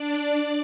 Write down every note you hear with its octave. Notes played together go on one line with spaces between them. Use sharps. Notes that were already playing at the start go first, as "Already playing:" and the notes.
Already playing: D4 D5